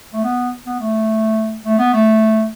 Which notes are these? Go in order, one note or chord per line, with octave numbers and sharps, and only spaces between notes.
A3
B3
B3
A3
A3
B3
A3